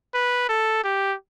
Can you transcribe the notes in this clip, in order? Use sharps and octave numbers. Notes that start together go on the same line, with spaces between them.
B4
A4
G4